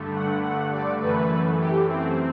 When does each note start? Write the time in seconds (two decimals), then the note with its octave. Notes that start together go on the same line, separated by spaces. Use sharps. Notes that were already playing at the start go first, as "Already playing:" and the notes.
Already playing: G2 D3 A3
0.15 F#5
0.44 F#5
0.73 D5
1.02 F#2 E3 A3 B4
1.60 G4
1.89 C4